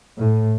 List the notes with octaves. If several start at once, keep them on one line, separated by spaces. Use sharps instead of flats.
A2